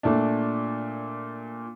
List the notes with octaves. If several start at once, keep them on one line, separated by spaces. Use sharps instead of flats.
A#2 A3 D4